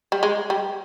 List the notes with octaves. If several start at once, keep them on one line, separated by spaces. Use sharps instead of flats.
G3
G#3
G3